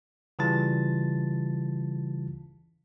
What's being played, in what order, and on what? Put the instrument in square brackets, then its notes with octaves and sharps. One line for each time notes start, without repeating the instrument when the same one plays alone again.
[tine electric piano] C#3 E3 G3 F4 A5 A6